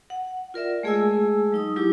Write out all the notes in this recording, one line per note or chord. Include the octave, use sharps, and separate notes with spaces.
F#5
F4 A#4 D5 E5
G#3 A3 G#4 D#5 G#5 E6
F#3 D#4 D#6
F#3 E4 G4 D6